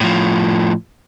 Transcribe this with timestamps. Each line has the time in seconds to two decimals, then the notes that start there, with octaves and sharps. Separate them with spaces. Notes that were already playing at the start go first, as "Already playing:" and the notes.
0.01 A2 F3